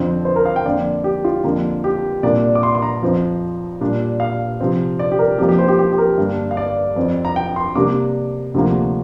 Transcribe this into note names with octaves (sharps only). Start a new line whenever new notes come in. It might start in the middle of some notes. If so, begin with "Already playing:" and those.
Already playing: F2 D3 F3 C4
C5
A#4
F5
G5
F2 D3 A#3 D5
G4
F4
F2 D3 A#3
G4
C2 A#2 A#3 D4 D5
D6
C6
C6
A#5
F2 F3 C4
A#2 G3 D4
F5
C3 F3 C4
D5
G4
A#4
F2 F3 A#3 G4
G4
C5
G4
G4
G4
A#4
G2 D3 A#3 D4
F5
D5
F2 F3 C4
A#5
G5
C6
C3 G3 A#3 D4 D6
D2 C3 F3 A#3